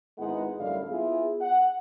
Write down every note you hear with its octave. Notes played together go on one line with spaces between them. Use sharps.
G#1 G#3 B3 D#4 E4 F#5
F#2 A2 D3 G3 F5
B3 E4 F4 G#4
F#5